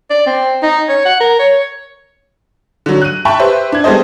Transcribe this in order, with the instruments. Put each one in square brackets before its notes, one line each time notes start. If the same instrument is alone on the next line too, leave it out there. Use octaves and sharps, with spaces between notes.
[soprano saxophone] D5
C4
D#4
C#5
F#5
A#4
C#5
[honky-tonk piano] D3 F#3
F#6 D#7
E5 G5 A5 B5 C#6
G4 B4 C5 E5
D4 G#6
G3 G#3 B3 A4 C5 D#5